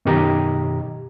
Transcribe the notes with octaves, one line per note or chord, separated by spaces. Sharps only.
F#2 B2 D#3 G4 D#5 A#5